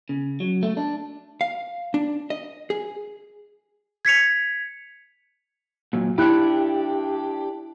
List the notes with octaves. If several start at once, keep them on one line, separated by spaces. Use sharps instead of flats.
C#3
F#3
A3
D4
F5
D4
D#5
G#4
G#6 B6 C#7 F7
A#2 F#3
D4 E4 G4 F#6 C#7